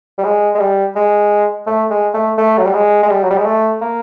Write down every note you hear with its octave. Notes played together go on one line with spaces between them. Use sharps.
G3
G#3
G#3
G3
G#3
A3
G#3
A3
A3
F#3
G3
G#3
G#3
G3
F#3
G3
G#3
A3
A#3